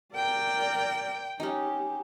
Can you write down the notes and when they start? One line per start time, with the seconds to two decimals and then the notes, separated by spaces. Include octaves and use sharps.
0.15 A#4 D5 G5
1.40 C#4 D#4 G4